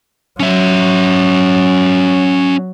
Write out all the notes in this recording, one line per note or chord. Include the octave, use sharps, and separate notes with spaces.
F#3 C#4 E5